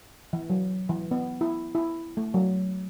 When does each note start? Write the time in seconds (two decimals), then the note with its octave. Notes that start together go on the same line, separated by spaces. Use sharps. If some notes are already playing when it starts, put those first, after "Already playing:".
0.33 E3
0.50 F#3
0.89 E3
1.11 B3
1.41 E4
1.75 E4
2.17 A3
2.34 F#3